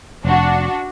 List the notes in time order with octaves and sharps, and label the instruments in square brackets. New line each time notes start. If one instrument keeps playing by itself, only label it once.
[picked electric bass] F1 [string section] D4 F#4